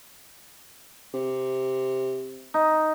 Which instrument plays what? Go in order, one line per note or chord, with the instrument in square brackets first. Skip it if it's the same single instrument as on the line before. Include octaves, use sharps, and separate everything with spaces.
[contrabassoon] C3
[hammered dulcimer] D#4